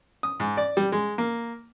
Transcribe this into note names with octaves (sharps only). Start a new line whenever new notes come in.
D#6
G#2
D5
G3
G#3
A#3